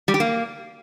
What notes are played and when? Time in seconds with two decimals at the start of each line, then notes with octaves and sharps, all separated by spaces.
0.08 G3
0.14 G4
0.20 A#3